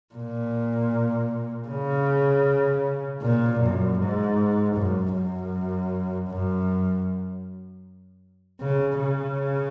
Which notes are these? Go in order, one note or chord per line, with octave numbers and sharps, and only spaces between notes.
A#2
C#3
A#2
F#2
G#2
F#2
F#2
F#2
C#3
C#3